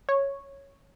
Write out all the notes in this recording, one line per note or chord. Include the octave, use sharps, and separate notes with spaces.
C#5